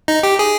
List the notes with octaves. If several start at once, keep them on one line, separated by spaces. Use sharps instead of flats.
D#4
G4
G#4